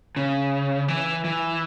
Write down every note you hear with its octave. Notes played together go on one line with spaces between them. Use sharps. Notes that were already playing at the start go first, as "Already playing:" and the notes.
C#3
E3
E3